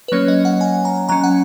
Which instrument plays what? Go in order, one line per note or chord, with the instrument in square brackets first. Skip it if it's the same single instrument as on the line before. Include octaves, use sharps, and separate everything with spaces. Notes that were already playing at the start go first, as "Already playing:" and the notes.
[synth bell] B4
F#3 A#3 C#4 C#5
D#5
F#5
G#5
A#5
F#3 C#4 A#5
F#5